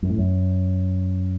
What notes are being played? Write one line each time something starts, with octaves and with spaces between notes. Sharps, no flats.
F#2
A2
F#2